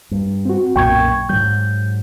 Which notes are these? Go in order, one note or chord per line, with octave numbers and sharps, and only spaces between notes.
G2
C4 F#4
B1 F#2 A#2 G5 C#6 G#6
G#2 F#3 G6